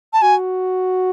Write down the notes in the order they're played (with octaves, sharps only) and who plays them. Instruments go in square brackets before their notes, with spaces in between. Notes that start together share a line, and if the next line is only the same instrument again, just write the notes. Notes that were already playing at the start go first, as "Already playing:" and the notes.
[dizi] A5
[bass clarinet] F#4 [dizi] G#5